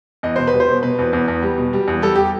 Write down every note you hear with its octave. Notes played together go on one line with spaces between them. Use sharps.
E2 D#5
B2 C5
B4
G3
C5
B2
B2 B4
E2
E2
E2
G3
B2
G3
E2
G3 A4
G3 G4